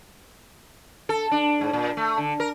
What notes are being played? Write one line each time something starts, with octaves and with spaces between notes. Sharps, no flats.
A4
D4
G#2
A#2
A3
D3
A#4